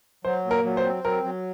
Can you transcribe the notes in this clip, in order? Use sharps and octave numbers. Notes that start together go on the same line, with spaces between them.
F#3 C5
A#2
A#4
F#3
C5
C4
F#3 A#4
F#3